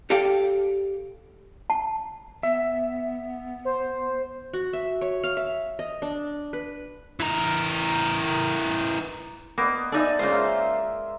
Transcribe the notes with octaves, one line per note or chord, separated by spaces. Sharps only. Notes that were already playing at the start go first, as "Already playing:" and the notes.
G4 A4 D5 F5 G5
A5
B3 E5
C5
F#4
E5
C#5
F5
E5
D#5
D4
B4
E3 A#4
A#3 B3 D#5
D4 D#4 A4 D5 E5 G#5
C#3 G#3 A#3 F4 C5
A#4 E5 C6